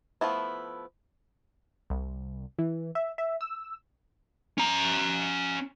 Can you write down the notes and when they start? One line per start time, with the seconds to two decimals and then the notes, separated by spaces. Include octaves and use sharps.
0.21 F3 A3 B3 E4
1.90 C2
2.59 E3
2.95 E5
3.18 E5
3.41 E6
4.58 C#4 A#5